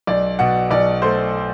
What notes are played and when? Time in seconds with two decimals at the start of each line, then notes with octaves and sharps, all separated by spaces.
0.07 B1 D5
0.39 B2 F#5
0.71 B1 D5
1.02 A3 C5